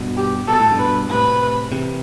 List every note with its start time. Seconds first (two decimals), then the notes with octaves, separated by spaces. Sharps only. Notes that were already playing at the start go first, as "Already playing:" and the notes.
Already playing: G2 B2
0.17 G4
0.48 B2 A4
0.60 A2
0.71 G2 B2
0.79 B4
1.10 A2 C3 B4
1.72 C3 E3